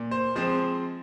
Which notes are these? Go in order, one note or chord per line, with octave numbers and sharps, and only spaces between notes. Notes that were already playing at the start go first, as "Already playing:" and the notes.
Already playing: A#2
C5
F3 G#3 C4 C5